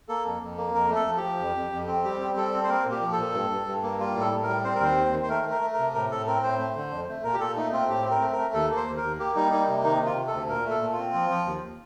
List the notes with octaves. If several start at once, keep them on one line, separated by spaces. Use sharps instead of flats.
A#3 A4
F2
F2
A#3
F2 A#4
A3
A4
F3
G4
F3
F2
F2
F2
C4
G3 G4
C4
G3 A4
C4
C5
A#3 A#4
A#2
G4
F3
A#2 A4
G2
G2
G2
A#3
G3 F4
A2
A4
A2
A#4
G3
C4 C5
A#4
D#2 C5
D#3
D#3
C5
A3 A#4
A3 A#4
A3
A#4
C3
A2 A#4
A2 A4
C4 A#4
A2 C5
A3
D3
F2
A3
A#2 A#4
G4
A#2 A4
A3 D#4
C4 F4
A2 G4
C4
A#4
A3
A#4
A3
D#2 A4
A#3
C5
D#2
A#4
D#2
A#3 G4
G3 D#4
A#3 D#4
C3
D#3 D#4
D#3
F4
C3
A4
D2
A#2 A#4
A3
A4
A#2
F4
C4
F3
F3
D#2